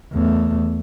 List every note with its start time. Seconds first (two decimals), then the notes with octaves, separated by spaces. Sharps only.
0.12 E2 A3